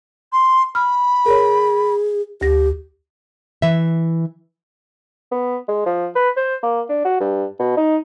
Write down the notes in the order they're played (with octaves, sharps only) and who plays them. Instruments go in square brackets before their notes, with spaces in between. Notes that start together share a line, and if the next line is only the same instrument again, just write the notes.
[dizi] C6
[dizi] B5 [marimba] F6
[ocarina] G#4 [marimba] A#4 C#5
[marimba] D2 A#6 [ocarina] G4
[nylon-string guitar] E3 E5
[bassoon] B3
G#3
F3
B4
C5
A#3
D4
F#4
G2
B2
D#4